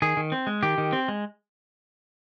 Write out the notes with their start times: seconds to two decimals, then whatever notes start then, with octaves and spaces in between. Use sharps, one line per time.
0.02 D#3 G#4
0.17 D#3
0.32 C4
0.47 G#3
0.63 D#3 G4
0.78 D#3
0.93 C4
1.08 G#3